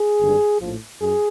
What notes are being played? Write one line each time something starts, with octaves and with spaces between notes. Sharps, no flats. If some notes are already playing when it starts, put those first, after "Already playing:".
Already playing: G#4
G#1 G2 D3 G3
A#1 A2 F3
F#2 G#4